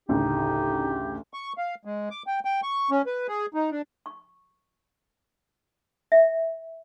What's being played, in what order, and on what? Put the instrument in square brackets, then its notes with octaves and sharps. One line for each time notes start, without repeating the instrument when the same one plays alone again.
[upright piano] A1 D2 C#3 [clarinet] D#4 [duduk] G4
[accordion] C#6
F5
G#3
D6
G5
G5
C#6
C#4
B4
G#4
D#4
D4
[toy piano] C#6
E5